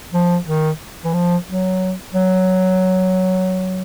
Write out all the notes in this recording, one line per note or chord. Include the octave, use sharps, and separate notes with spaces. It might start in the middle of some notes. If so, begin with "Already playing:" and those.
F3
D#3
E3
F3
F#3
F#3